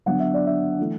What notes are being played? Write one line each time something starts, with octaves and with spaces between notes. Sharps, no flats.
D3 F#3 B3 D4 F#5
E5
D5
E5
E3 A3 E4